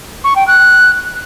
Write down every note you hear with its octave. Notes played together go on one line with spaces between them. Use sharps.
C#6
G5
F#6